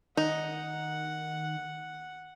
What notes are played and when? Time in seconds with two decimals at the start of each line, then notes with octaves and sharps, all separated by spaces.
0.17 D#3 D#4 F#5